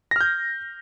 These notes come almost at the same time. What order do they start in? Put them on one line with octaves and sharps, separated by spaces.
A#6 F6 G6